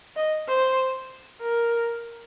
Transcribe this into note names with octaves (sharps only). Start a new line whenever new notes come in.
D#5
C5
A#4